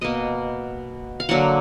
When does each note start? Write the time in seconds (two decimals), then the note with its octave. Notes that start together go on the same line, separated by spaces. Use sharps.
0.01 B2 A#3 D#5
1.20 F5
1.29 D3 F#3 A#3 F#5